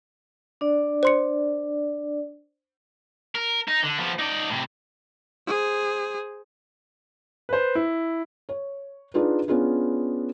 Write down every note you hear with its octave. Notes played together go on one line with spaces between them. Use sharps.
D4 D5
C5 C6 C#7
A#4
D#4
D3
F3 B3
D#4 D5
A2 C3
G#4 C5
B4 C5
E4
C#5
D4 D#4 F4 G#4 B4
B3 C#4 D4 F4 G#4 B4